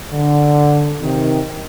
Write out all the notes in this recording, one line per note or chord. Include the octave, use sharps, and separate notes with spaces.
D3
C3 D#3